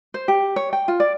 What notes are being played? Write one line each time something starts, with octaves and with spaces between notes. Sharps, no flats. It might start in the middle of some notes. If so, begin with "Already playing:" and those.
C5
G4
C#5
G5
F4
D5